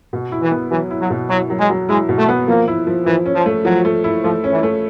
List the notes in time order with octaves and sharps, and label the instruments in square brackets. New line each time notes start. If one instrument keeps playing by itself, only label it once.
[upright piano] B2
E4
[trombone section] E3
[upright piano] B3
[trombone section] E3 [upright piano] F#3
[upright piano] E4
[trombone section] F#3
[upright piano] B2
[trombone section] F#3 [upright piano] E4
[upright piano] F#3
[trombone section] G#3
[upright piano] F#3
[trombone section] G#3 [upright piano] E4
[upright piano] B2
[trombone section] A3
[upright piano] B3
[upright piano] F3 [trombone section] A#3
[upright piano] E4
F3
[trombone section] E3 [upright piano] F3
[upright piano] C#4
[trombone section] F3
[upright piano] A3
[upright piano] F3 [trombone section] F#3
[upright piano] A3
E4
[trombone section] F3 [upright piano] A3
[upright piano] C#4
[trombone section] E3
[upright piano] A3